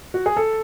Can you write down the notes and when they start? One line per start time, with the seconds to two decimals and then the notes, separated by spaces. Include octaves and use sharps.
0.14 F#4
0.26 G#4
0.37 A4